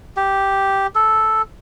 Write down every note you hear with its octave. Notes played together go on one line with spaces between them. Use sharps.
G4
A4